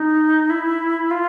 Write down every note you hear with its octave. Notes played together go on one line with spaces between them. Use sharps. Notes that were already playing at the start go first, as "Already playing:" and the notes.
Already playing: D#4
E4
F4